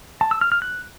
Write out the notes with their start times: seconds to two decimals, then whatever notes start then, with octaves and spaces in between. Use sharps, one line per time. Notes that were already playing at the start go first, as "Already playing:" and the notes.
0.21 A5
0.31 E6
0.41 F6
0.52 F6
0.62 F#6